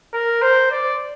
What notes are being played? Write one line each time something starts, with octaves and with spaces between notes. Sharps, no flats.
A#4
C5
D5